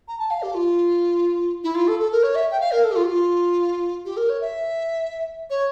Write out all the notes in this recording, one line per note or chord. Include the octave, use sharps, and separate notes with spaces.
A#5
A5
F5
G4
F4
E4
F4
A4
A4
A#4
C#5
E5
G5
F5
A#4
A4
G4
F4
G4
F4
G4
A#4
C#5
E5
C#5